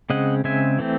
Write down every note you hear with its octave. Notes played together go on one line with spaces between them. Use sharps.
C#3 G#3 C4 D#5 F#5
C#3 G#3 C4 E5 G#5
E3 A3 C4